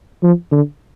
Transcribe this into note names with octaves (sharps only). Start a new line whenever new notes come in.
F3
D3